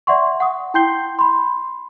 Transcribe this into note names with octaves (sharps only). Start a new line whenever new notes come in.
D5 E5 F#5 C6 C#6
F#5 C#6 D#6
E4 G5 C6 G6 C7 G7
B5 C6